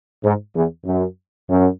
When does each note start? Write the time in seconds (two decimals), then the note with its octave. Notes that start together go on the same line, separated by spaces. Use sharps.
0.23 G#2
0.55 E2
0.85 F#2
1.49 F#2